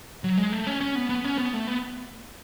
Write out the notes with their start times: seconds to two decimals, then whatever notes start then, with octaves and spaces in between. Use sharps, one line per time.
0.24 F#3
0.38 G#3
0.52 A3
0.67 C#4
0.81 C#4
0.95 B3
1.09 B3
1.24 C#4
1.38 B3
1.53 A3
1.67 B3